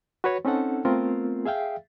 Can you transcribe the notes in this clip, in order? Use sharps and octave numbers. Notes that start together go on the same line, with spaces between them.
F#4 B4 C#5
C4 C#4 D#4 A4 F#5
A3 B3 C4 F4 A#4
G#4 E5 F5 G5